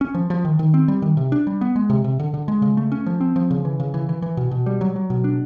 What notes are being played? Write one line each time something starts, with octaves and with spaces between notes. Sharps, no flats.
C#4
F3
F3
D#3
D#3
C4
G3
D#3
C3
D4
G3
B3
G#3
C3
C3
D3
D3
G#3
C#3
A3
C#4
F3
C4
F3
C#3
E3
C#3
E3
E3
E3
B2
B2
G3
F#3
F#3
B2
D4